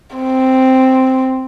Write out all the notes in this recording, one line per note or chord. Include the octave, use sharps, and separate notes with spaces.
C4